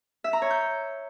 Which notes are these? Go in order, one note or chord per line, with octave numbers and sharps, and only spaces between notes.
E5
A#5
C#5
G6